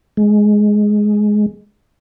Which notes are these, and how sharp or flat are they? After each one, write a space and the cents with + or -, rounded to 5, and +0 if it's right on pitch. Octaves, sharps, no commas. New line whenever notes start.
G#3 +10